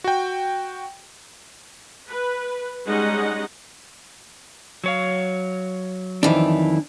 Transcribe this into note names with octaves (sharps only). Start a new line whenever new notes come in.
F#4 G5
B4
G3 G#3 C#4 D#4 D#5 F#5
F#3 C#5 F5
F2 D#3 E3 D4